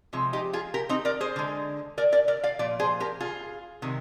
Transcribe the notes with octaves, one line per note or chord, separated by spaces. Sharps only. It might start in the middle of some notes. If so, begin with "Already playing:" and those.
C3 F3 G#3
D#4 G4
F4 G#4
G4 A#4
C4 D#4
A#4 D5
G#4 C5
D3 G#3
A#4 D5
A#4 D5
A#4 D5
D5 F5
A#2 F3 D5
G#4 C5
G4 A#4
F4 G#4
C3 D#3 G#3